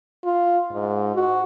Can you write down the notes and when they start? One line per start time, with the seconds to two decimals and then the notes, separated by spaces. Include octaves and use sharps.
0.24 F4
0.73 G#2
1.15 F#4